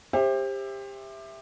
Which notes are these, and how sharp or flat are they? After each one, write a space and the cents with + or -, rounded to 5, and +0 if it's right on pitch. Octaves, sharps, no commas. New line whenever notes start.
G4 +25 C5 +25 E5 +0